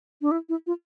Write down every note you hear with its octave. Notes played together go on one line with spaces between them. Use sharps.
D4
E4
E4
F4